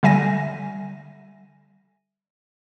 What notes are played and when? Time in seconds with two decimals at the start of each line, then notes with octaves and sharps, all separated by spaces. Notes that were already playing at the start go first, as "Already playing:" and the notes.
0.03 D3 G3 E5 G#5 A#6 D#7